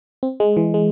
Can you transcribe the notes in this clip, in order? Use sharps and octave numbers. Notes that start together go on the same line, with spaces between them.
C4
G#3
E3
G#3